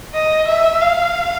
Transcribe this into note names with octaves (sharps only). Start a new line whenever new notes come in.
D#5
E5
F5